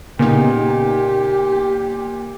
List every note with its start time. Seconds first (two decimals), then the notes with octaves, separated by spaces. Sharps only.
0.19 A#2 C#3 B3 D#4 G4